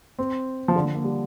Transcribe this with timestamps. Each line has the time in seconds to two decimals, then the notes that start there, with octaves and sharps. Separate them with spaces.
0.19 C4
0.68 F3
0.76 D3
0.85 F3
0.94 A#3
1.04 G3